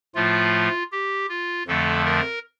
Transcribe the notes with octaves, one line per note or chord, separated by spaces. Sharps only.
A2 F3 A3 F4
G4
F4
F2 D3 F3 A3 A4
A#4